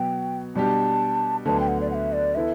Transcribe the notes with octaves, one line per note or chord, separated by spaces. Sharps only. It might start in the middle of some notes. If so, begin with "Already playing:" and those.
Already playing: B2 F#3 B3 G5
B2 G3 D4 G4 A5
D2 D3 F#3 B3 D4 A5
G5
F#5
D5
F#5
E5
D5
E3 B3 E4 A4 E5